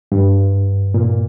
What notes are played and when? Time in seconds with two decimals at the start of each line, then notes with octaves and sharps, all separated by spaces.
0.12 G2
0.94 A#2